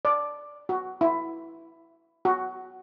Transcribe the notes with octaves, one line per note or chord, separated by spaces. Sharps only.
D5
F#4
E4
F#4